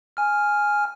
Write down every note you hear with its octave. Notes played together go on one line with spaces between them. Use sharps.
G#5 F6